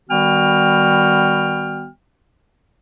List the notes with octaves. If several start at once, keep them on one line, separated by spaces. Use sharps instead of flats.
D#3 G3 B3 F#4 G5 F6